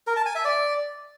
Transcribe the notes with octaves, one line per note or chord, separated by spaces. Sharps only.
A#4
A5
G#5
E5
D5